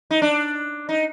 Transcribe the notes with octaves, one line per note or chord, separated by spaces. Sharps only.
D#4
D4
D#4